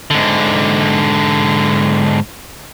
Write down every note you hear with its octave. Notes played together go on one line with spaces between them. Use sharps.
G#2 D3